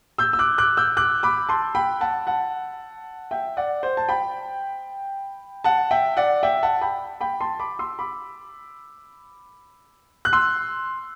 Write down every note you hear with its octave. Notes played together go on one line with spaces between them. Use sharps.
E6 G6
E6
D6 F#6
D6 F#6
E6 G6
D6 F#6
B5 D6
A5 C6
G5 B5
F#5 A5
F#5 A5
E5 G5
D5 F#5
C5
A5
G5 B5
F#5 A5
E5 G5
D5 F#5
E5 G5
F#5 A5
G5 B5
G5 B5
A5 C6
B5 D6
C6 E6
B5 D6
F#6
C6 E6